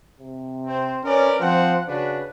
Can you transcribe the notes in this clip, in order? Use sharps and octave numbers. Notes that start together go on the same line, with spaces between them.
C3
C4 C5
C#4 A#4 B4 D5
F3 C4 C5 F#5
C#3 D4 F#4 B4